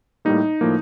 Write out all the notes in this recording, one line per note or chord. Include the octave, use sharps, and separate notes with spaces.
A2 G3 A#3 D#4
A2 F3 A#3